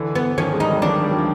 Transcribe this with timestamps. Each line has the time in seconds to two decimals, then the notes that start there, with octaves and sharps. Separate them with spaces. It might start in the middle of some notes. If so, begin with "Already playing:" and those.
Already playing: D3 E3
0.15 B3
0.38 D#3 F3 C#4
0.53 G#3
0.60 G3 D#4
0.72 F#3
0.82 D#3 F3 D4
1.03 G3
1.11 F#3
1.18 F3